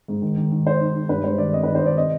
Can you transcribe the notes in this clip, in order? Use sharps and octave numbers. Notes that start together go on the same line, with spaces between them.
G#2
D#3
D#3
D#3
D#4 C5
D#4
D#4
G2 B4
G#3 C5
D#3 D5
C4 D#5
D#3 B4
C5
D#3 D5
C3 D#5